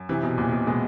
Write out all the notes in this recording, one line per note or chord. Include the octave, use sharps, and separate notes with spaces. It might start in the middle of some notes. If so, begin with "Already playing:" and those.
Already playing: F#2
C3 E3
B2
E2 A#2
B2
B2 G#3